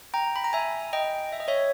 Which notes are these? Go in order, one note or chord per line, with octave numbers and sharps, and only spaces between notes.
G5 A#5
B5
A#5
E5 G#5
D#5 G5
E5
D#5
C#5 E5